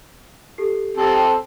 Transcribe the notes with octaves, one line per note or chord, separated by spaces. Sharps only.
G4 A4 C7
C4 G4 A4 E6 A6
G5